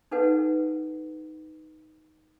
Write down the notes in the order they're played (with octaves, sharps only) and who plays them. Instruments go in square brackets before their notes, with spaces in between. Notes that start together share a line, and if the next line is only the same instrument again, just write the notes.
[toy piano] D#4 A4 B4 F#5